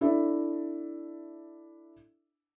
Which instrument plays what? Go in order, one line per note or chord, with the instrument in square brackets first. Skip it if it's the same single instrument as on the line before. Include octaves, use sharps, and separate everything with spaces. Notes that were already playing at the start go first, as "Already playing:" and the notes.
[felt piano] D4 E4 A4 D5 E5